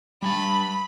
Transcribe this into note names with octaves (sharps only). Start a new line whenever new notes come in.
G3 G#5 A5 B5